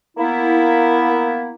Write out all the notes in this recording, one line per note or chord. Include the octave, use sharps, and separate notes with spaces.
A#3 B3 E4